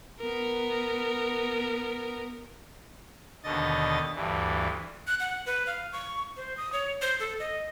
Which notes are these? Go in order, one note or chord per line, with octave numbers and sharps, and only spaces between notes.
B3 A#4
D#2 B2 D3 D#5 A6
D2 G2 E3
F#6
F#5
B4
F5
C#6
C5
D#6
C#5
C5
A4
D#5